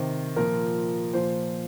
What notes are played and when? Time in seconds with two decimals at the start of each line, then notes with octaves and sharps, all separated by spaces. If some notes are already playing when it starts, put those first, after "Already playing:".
Already playing: C3 D#3 C5
0.36 A#2 F3 A#4
1.13 A#2 F3 C5